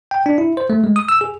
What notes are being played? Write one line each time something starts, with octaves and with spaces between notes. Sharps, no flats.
G5
D4
E4
C5
A3
G#3
D#6
E6
G#4